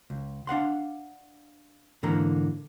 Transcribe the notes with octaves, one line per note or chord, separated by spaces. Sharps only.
C#2
D4 F5 F#5 C6
G#2 D3 E3 A#3 A#5